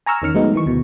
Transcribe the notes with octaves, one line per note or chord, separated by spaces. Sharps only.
G#5 A#5 C#6 E6 F6
E2 D#3 C#4 F6 C#7
F#3 G#3 A3 B3 D#4
D#3 E3 C#6
D2 B2